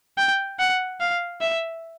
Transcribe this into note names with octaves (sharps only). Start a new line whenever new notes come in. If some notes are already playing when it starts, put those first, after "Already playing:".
G5
F#5
F5
E5